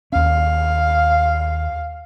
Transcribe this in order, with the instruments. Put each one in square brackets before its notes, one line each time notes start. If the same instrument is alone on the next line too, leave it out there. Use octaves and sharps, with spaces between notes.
[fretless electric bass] D#2 C#4 [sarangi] F5